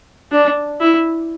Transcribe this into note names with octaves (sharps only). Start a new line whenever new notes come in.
D4
E4